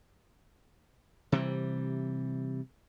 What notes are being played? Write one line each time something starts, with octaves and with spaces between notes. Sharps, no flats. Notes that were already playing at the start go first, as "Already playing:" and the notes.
C3 E3 G3